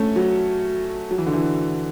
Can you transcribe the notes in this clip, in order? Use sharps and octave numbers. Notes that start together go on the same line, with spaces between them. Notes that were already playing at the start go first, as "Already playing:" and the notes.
Already playing: A3 C#4
F#3
F#3
E3
D3
E3